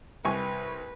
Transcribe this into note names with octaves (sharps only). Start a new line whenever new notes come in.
C2 B4 G#5 C#6